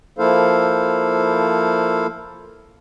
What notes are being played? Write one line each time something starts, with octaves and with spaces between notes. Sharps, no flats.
F3 A#3 E4 A4 C5 F5